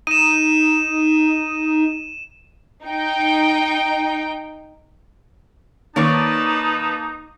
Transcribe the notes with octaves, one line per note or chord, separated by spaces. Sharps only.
D#4 D#7 E7
D#4 G5
D#3 A#3 D#4 B4 C#5 D5 A5 A6